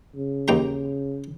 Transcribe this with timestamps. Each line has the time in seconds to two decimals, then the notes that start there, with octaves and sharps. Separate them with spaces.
0.16 C#3
0.48 D#2 G5 A#5